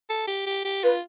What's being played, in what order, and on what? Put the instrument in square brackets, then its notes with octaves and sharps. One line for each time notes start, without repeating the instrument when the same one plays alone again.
[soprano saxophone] A4
G4
G4
G4
[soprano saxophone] F4 [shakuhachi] B4